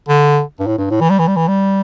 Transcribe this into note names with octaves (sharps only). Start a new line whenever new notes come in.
D3
G2
A2
G2
A2
E3
G3
E3
G3
E3
G3